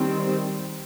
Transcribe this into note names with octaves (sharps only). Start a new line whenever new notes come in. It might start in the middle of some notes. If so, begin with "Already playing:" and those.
Already playing: D#3 G3 C4